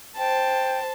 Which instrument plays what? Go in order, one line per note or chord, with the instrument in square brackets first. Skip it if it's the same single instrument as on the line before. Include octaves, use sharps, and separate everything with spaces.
[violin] C5 A5 [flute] G5